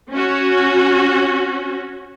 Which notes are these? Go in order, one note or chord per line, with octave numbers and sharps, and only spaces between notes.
C#4 F#4